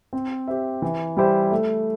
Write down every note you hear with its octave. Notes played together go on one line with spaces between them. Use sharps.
C4
G4 C5 E5
E3
G3 E4 G4 C5
A3